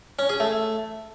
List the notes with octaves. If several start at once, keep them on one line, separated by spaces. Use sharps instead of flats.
C#4
G#4
A3